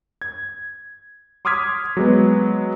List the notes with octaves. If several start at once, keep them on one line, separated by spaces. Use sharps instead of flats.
G#6
C6 D6 D#6 F6 G#6 B6
F#3 G#3 B3